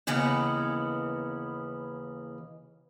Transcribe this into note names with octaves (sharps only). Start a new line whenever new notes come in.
D#2 C#3 E3 B3 F#5